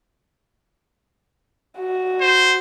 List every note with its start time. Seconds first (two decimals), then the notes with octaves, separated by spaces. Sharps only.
1.78 F#4
2.21 C5